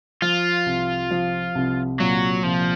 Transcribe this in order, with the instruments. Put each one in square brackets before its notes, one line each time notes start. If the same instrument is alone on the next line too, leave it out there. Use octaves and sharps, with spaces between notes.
[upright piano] F3 [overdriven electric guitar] F4
[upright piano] C2
F3
C2
[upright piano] A#2 [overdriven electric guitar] F#3
[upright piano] C2 [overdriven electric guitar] F3